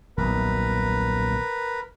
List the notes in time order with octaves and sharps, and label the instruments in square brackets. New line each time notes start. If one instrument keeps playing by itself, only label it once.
[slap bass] D#1 B1 [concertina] A#4 B4